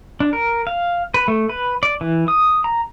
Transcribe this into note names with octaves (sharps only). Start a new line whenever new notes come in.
D4
A#4
F5
B4
A3
B4
D5
E3
D#6
A#5